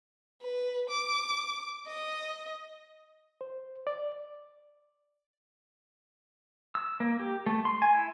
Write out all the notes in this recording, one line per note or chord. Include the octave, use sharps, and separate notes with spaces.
B4
D6
D#5
C5
D5
E6
A#3
G4
A3
C6
G#5
E4